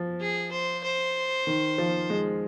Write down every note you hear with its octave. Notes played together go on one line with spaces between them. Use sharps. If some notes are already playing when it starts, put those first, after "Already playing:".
Already playing: F3
G#4
C5
C5
D#3
F3
G#3